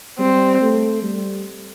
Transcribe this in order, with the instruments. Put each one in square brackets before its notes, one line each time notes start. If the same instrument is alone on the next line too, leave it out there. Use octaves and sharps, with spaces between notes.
[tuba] G3 [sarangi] C4
[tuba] A3
G3